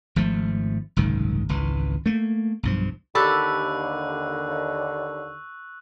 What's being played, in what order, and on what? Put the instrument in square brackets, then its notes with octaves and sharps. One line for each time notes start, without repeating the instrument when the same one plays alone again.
[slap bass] G#1 F3 A3
F#1 C2 G#2 D#3
G#1 C#2 E3
A3 A#3
B1 G2 F3
[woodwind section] D#2 D3 [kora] G4 A4 [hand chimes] B5 [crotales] C#6 E6 F#6